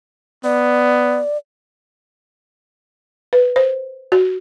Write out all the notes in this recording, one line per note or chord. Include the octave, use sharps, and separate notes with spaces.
B3 D5
B4
C5
F#4